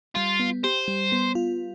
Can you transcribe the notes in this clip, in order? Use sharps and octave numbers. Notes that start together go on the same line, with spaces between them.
G3 F4
B3
G4 C5
G3
B3
F4